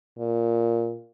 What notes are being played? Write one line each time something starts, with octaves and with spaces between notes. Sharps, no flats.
A#2